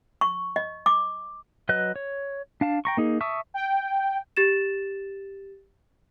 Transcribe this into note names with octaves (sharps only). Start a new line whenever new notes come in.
C#6
D#5
D6
F#3 B4 D#5 F#6
C#5
D4 F5 A5
G5 A#5 C#6
A#3 D#4 G#4
E5 A5 C#6 D#6 E6
G5
G4 A6 E7